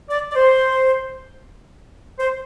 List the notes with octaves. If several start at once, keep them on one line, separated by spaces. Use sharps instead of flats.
D5
D5
C5
C5